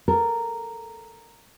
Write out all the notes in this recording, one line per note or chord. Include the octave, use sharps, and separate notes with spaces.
A4 A#4